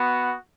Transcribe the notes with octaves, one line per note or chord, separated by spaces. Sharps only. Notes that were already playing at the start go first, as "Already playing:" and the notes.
Already playing: B3 F#4